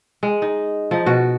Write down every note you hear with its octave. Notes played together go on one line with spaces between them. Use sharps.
G#3
D#4
F3 D#4
B2 F#4